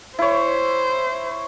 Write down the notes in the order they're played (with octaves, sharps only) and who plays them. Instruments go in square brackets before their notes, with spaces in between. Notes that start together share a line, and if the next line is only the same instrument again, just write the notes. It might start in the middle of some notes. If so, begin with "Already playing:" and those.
[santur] E4 C#5 [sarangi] C5